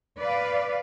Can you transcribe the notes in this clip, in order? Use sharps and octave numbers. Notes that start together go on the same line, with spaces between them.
B4 D5 F5